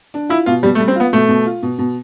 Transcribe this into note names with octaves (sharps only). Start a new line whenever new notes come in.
D4
E4 F4
B2 F4
B2 G3
A3
G3
C4
B3 F4
B2 A3
B2
F4
B2
B2